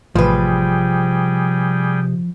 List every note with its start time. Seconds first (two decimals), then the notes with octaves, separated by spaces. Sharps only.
0.15 A1 C3 F3 G3 G#4 B4 G5